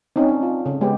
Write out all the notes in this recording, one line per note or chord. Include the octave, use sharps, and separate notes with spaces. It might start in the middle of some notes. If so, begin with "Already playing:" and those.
C4 C#4 D#4
D4
F4
C#3
G#3 B3 G4